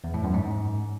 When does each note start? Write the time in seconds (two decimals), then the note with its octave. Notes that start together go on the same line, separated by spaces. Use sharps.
0.04 E2
0.14 A2
0.24 F#2
0.34 G#2